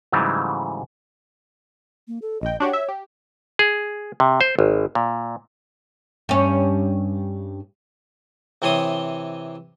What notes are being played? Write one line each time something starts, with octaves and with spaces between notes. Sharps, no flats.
G#2 C#3 E3 F#3 G3 A3
A#3
A4
A#1 D#5 G5
D4 F#4 G4 C#5
E5
G4
G#4
C3
C5
G#1
A#2
G2 C#4
C3 E3 C4 C#5 C6 D#6